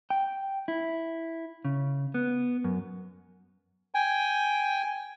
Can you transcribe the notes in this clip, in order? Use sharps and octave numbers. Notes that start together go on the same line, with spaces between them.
G5
E4
C#3
B3
F#2
G5 G#5